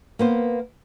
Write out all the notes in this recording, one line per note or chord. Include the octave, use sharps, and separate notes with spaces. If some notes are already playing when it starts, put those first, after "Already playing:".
A#3 B3 C5